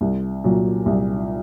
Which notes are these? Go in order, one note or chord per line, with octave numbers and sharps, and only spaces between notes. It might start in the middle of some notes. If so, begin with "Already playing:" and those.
C2
A#2 F#3
C2